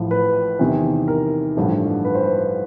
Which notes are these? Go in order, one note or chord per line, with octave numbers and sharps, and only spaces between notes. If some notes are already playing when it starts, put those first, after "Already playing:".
Already playing: A1 A2 F3
B4
E2 C3 D#3
A#4
A1 G2 D3 F3
B4
C5
B4